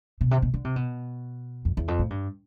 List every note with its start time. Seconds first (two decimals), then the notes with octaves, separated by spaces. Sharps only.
0.21 B2
0.31 C3
0.42 B2
0.54 D3
0.64 C3
0.76 B2
1.65 F2
1.77 E2
1.88 F2
1.99 A2
2.10 G2